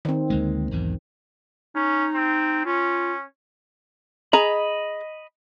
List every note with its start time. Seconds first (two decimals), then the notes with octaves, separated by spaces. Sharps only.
0.05 D#3 C4
0.30 D2 G#3 A#3
0.71 B1 E2 G#2
1.75 C#4 D#4
2.14 C4
2.65 C#4 F4
4.33 G#4 D#5 A#5 B5